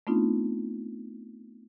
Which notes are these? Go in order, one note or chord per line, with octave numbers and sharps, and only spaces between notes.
A3 B3 C4 D4 D#4 F4